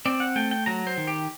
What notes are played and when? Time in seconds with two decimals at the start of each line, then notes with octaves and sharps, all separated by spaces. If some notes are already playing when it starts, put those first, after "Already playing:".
0.06 C4 D5
0.20 F#5
0.36 A3 G5
0.51 G5
0.66 F#3 A#5
0.87 C5
0.97 D#3
1.07 G4